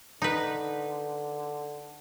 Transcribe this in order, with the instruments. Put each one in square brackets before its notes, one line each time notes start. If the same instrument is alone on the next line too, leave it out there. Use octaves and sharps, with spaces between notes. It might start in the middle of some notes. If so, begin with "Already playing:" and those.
[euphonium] D3 [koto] D#4 B4